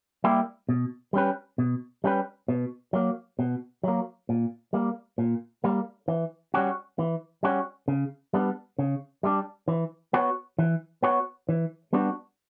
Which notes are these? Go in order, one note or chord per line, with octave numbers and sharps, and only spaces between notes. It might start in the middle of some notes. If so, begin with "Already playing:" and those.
G3 A#3 E4 G4
B2
G3 C#4 G4 B4
B2
G3 C#4 G4 B4
B2
F#3 A#3
B2
F#3 A#3
A#2
G3 A#3
A#2
G3 A#3
E3
G3 C#4 F#4
E3
G3 C#4 F#4
C#3
G3 B3 D4
C#3
G3 B3 D4
E3
B3 F#4 C#5
E3
B3 F#4 C#5
E3
G3 B3 D4 F#4